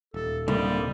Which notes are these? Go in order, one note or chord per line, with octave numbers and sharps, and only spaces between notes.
D#1 A4
C2 D3 G3 A#3 D#5